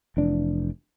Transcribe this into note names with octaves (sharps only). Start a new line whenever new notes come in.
F1 E3 D4